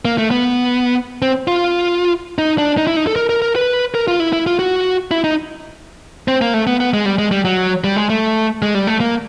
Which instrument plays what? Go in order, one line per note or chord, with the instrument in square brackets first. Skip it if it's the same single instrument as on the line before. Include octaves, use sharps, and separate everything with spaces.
[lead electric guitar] A#3
A3
B3
C4
F4
D#4
D4
D#4
E4
D#4
A4
A#4
A#4
A#4
B4
A#4
F4
E4
E4
F4
F#4
E4
D#4
C4
A#3
A3
B3
B3
G#3
G3
G#3
G3
F#3
G3
G#3
A3
G#3
G3
A3
A#3